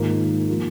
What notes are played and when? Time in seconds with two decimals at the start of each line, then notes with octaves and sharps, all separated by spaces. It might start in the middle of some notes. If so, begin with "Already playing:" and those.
Already playing: G#2 D#3 A#3 F4
0.49 F3 A#3